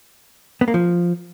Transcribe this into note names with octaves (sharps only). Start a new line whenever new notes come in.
B3
A#3
F3